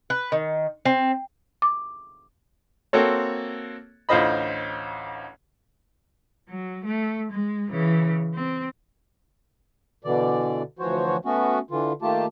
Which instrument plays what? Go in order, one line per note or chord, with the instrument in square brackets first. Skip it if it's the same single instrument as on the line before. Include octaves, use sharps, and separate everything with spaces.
[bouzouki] B4
D#3
C4
[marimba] D6
[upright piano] A#3 C4 F#4 A4 C#5
A1 D2 F4 C5 D#5 B5
[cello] F#3
A3
G#3
C#3 E3
C4
[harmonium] B2 D3 E3 D5
D2 E3 F3 F#4 C5 C#5
A3 B3 C#4 F#4
D3 E3 F4
D#3 A3 A#3 F4 G4 A5